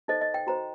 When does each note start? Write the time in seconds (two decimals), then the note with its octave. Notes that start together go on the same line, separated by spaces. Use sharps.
0.08 D#4 A4 C5 D#5
0.21 D#5
0.34 G5
0.47 F#4 C5 A#5